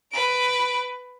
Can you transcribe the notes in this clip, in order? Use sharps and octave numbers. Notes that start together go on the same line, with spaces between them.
B4 D7